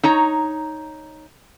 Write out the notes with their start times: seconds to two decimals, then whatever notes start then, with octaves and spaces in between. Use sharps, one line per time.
0.03 D#4 C#5 A#5